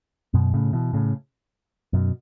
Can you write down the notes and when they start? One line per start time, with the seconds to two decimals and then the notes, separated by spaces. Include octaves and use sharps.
0.34 F#2 B2
0.54 A2 C#3
0.73 B2 E3
0.93 A2 C#3
1.93 F#2 B2